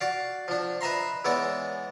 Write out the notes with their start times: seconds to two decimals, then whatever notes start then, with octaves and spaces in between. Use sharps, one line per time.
0.01 F#4 D5 F5
0.48 F3 D4
0.81 B4 D#5 E5 A#5 C6
1.25 E3 G#3 B3 C#5 D5